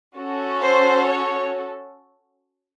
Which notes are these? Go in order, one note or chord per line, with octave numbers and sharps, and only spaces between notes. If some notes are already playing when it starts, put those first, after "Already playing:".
C#4 F#4 A4
C5
C#5